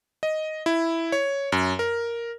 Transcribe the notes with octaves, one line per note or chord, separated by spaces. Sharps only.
D#5
E4
C#5
F#2
A#4